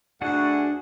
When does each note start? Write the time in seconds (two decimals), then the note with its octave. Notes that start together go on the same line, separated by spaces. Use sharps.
0.22 D2 D4 F#4 G#4 F#5